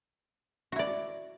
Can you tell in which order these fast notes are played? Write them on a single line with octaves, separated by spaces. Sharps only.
F#4 E4 D5